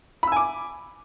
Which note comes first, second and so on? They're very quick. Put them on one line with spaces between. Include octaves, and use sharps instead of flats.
B5 E6 G#5 D6